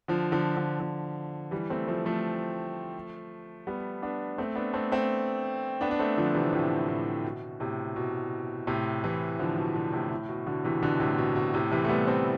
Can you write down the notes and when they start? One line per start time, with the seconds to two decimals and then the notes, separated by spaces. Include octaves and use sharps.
0.08 D3 F3
0.32 D3 F3
0.56 D3 F3
0.80 D3 F3
1.51 E3 G3
1.70 A3 C4
1.88 F3 A3
2.05 F3 A3
3.67 G3 B3
4.02 B3 D4
4.38 A3 C4
4.56 B3 D4
4.73 A3 C4
4.92 A3 C4
5.81 B3 D4
5.91 D4
5.99 A3 C4
6.17 D3 F3
6.34 C3 E3
6.53 A2 C3
6.88 A2
7.24 B2
7.60 A2 C3
7.96 B2
8.67 A2 C3
9.04 C3 E3
9.39 D3 F3
9.57 B2 D3
9.75 B2 D3
9.93 A2 C3
10.11 A2
10.29 B2
10.46 B2 D3
10.64 C3 E3
10.83 B2 D3
11.00 A2 C3
11.18 B2
11.36 B2
11.54 A2 C3
11.71 C3 E3
11.84 A3
11.89 G3 B3
12.07 A3 C4